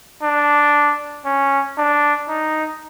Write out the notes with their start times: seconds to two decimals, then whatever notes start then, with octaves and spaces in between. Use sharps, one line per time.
0.23 D4
1.25 C#4
1.78 D4
2.28 D#4